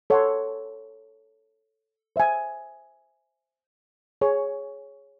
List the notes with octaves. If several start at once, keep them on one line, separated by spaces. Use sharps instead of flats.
A4 C#5 F#5 C6
C5 E5 G#5
G#4 C#5 G#5 C#6